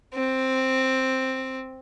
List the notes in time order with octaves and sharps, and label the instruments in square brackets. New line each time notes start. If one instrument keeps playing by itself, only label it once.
[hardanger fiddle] C4